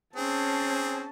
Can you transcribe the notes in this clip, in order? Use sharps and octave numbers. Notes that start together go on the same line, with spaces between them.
C4 C#4 G#4 A5